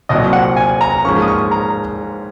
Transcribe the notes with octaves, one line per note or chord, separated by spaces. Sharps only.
C2 A#2 F#3 C4 D#5
F#5
G#5
A#5
G#2 F3 A#3 C#4 C#6
D#6
C#6
A#5